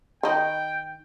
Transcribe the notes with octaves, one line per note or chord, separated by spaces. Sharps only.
D#3 D#4 G5 B5